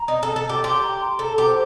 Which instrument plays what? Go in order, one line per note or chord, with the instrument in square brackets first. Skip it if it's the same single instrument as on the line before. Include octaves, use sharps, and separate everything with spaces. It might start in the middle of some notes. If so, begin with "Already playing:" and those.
Already playing: [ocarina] A#5
[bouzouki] D#4
A4
A4
G4
[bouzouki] G4 [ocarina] C6
[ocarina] A#5
C6
[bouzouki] A4 [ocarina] A#5
[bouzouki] G4
[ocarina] C5